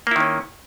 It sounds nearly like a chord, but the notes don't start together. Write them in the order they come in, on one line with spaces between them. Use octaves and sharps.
A#3 E4 D#3 C#4